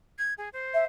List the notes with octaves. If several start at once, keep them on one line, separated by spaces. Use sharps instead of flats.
G#6
G#4
C5
E5